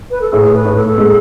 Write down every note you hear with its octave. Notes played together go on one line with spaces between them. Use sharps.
B4
A4
A2 G#4
B4
A2
A4
G#3